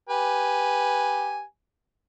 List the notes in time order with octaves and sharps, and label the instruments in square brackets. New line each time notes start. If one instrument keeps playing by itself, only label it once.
[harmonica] G4 B4 G#5